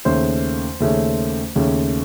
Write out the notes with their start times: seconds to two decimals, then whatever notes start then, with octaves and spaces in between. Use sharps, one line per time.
0.05 D#2 C#3 A3 C#4 C5
0.80 D#2 C#3 A3 C#4
1.56 D#2 C#3 A3 C#4